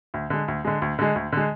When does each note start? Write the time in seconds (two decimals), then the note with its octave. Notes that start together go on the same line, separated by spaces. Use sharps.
0.14 D2
0.30 D3 G#3
0.48 D2
0.65 D3 G#3
0.82 D2
0.99 D3 G#3
1.15 D2
1.32 D3 G#3